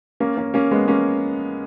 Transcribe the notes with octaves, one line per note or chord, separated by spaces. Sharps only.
A#3 C#4
A#3 C#4
A#3 C#4
G#3 B3
A#3 C#4